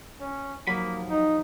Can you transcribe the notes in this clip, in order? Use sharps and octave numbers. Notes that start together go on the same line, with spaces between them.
C#4
D#2 F3 F#3 A#3 B5
D#4